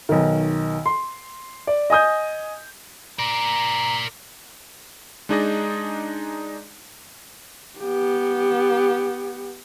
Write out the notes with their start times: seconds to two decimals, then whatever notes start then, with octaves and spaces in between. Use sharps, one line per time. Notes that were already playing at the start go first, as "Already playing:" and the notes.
0.09 B1 D#3
0.86 C6
1.67 D5
1.90 D#5 G#5 D#6 G6
3.19 A#4 D5 A#5
5.29 G#3 D4 D#4 G#4 D5 D#5
7.79 B3 G4